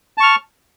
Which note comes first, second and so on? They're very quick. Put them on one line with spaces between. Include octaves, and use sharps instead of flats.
A5 C#6 F6